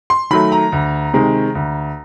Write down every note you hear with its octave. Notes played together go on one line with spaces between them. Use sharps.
C6
D#3 F#3 A3 B5
A#5
D2
C3 D#3 G#3
D2